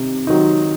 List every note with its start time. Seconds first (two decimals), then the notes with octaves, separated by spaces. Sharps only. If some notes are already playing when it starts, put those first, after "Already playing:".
Already playing: C3 D#3 D#4
0.27 D#3 F#3 C4 D#4